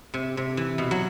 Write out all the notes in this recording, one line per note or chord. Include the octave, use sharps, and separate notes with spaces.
C3
C3
E3
B2
F#3